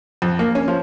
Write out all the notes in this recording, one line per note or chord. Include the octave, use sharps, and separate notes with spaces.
F2
A#3
C#4
F3